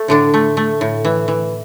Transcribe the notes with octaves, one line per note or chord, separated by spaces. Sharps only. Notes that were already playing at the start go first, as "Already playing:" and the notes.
Already playing: A3
A2 D3 D4
A3
A3
A2
E3
E3